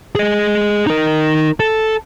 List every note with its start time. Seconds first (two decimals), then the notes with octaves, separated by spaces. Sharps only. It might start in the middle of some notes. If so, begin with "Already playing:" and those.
0.15 G#4 D#5
0.87 D#4 A#4
1.60 A4